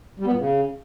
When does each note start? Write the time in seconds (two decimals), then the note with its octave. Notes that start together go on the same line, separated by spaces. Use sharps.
0.20 G3
0.26 B3
0.33 A#2
0.39 C#3